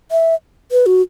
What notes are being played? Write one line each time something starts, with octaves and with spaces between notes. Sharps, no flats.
E5
B4
F#4